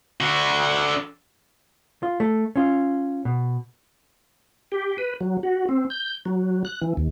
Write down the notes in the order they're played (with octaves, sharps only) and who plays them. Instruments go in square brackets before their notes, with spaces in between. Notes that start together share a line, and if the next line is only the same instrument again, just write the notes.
[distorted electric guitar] D3 F#4
[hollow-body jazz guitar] F4
A3
C#4 F4
B2
[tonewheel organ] G4
B4
F#3
F#4
C4
G6
F#3
F#6
E3
D#2